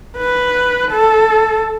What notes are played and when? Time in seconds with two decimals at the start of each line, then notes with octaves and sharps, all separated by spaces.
0.17 B4
0.92 A4